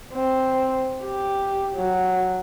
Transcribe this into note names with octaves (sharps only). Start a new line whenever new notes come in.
C4
G4
F#3